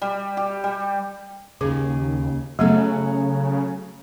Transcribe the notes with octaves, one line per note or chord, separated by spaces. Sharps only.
G3
G4
G3
D#2 C#3 G#4
C#3 F#3 A3 B3 C#4 A4